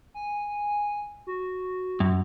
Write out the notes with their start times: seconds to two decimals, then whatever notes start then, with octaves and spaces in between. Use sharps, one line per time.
0.14 G#5
1.27 F#4
2.00 F#2